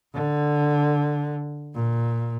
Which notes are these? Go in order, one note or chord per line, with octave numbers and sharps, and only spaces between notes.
D3
A#2